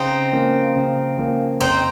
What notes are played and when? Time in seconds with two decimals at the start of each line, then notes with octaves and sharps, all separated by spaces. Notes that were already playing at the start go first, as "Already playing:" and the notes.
Already playing: C#3 C4 D#4
0.33 F3 A#3 C#4
0.76 C#3
1.18 F3 A#3 C#4
1.60 F2 C4 D#4